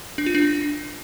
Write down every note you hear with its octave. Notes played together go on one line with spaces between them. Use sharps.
D4
F4
D4